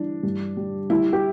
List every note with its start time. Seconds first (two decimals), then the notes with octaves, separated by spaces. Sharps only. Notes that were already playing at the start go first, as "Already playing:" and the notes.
Already playing: E3 G3 D4
0.23 G2
0.57 G3
0.90 G3 E4
1.13 G4